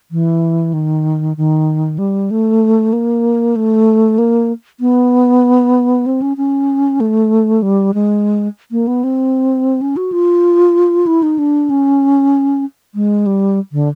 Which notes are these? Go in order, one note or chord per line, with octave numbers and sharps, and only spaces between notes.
E3
D#3
D#3
G3
A3
A#3
A3
A#3
B3
C4
C#4
C#4
A3
G3
G#3
A#3
B3
C4
C#4
F#4
F4
E4
D#4
D4
C#4
G#3
G3
D3